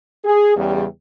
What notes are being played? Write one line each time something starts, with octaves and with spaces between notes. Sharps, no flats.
G#4
E2 C#3 G3